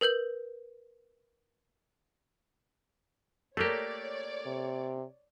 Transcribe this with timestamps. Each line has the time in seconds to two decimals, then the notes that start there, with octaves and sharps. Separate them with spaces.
0.01 A#4 B4 G6 F#7
3.57 A3 A#3 G4 A4 A#4 C#5 D5
4.46 C3